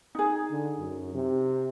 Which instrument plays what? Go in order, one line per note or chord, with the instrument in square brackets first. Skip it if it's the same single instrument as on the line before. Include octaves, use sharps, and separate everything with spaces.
[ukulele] D#4 G#4
[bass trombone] D3
F#2
C3